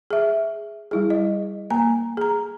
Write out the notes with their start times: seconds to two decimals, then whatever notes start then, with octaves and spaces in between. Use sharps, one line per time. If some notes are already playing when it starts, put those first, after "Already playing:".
0.10 G#4 E5
0.91 G3 E4 G#4
1.10 D#5
1.70 A#3 G#5 A#5
2.17 G#4 A#5